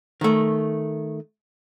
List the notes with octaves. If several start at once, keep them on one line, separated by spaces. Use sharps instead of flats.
D#3 A3